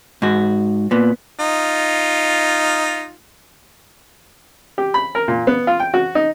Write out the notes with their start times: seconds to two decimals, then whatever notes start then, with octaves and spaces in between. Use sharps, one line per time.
0.22 G#2 F#4
0.91 A#2 B3
1.40 D#4 F4
4.78 G4
4.94 B5
5.15 A#4
5.28 A#2
5.47 B3
5.67 F4
5.80 G5
5.94 F#4
6.15 D#4